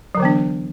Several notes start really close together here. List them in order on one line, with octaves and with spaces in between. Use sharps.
F#3 D3 E3 B3 D4